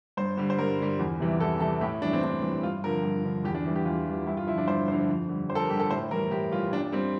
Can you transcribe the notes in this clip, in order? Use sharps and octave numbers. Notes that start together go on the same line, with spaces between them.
G2 C5
D3 G3
C5
G2 A#4
D3 G3
E2
C3 E3 G3
E2 A4
C3 E3 G3 A4
A2 G4
E3 G3 D4
C4
A2 D4
E3 G3
G2 F4
D3 F3 A#4
G2
D3 F3
E2 G4
D4
E3 G3
G4
E2 F4
E3 G3
G2 E4
F4
D3 F3 E4
D4
G2 C5
D3 F3 C5
F2
D3 G3
F2 C5
A4
A#4
D3 G3 G4
A4
A2 C5
E3 G3 A#4
A2 G4
E3 G3 F4
A#2 D4
G3 C4